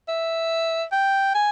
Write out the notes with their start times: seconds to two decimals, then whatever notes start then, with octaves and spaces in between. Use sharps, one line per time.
0.09 E5
0.92 G5
1.35 G#5